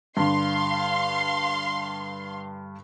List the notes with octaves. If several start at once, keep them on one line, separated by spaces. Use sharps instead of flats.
G2 D3 F5 C6